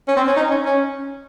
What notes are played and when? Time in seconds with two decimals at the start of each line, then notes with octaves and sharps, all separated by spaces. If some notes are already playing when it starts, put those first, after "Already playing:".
0.08 C#4
0.17 C4
0.27 C#4
0.37 D#4
0.51 C#4
0.65 C#4